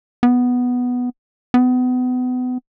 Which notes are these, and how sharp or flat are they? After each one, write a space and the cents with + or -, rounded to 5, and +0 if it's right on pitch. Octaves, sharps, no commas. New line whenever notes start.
B3 +0
B3 +30